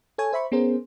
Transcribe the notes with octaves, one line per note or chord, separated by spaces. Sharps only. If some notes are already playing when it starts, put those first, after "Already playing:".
A4 C#5 G#5
C5 E5 B5 C#6
B3 C#4 G#4 A#4 C5